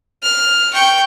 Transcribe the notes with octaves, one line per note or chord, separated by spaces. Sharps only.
F6
G5 C#6